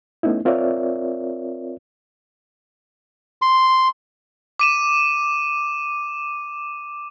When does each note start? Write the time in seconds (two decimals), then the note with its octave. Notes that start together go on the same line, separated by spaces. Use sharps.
0.23 A3 B3 C#4 D#4 E4
0.45 C4 F4 A#4 C#5 D5 E5
3.42 C6
4.59 D6 D#7 E7